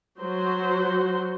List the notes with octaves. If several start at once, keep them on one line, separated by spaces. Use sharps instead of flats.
F#3 F#4 C5